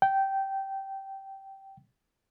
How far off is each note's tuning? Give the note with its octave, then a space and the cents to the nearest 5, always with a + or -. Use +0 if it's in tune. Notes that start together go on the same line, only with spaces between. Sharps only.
G5 -15